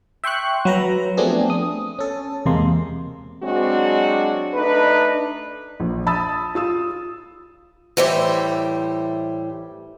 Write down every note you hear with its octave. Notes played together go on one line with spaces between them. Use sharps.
E5 G5 C6 C#6 F#6
F#3 B4 A#5
F3 A3 B3 C4 D4 G#4
D#6
C#4 A4
E2 C3 G#3 A#3 C6
F#3 G#3 C4 D4 F#4
A3 D4 D#4 B4
A#1
A5 B5 D#6 E6 A6
F4 D#6 E6
A2 E3 G3 C5 E5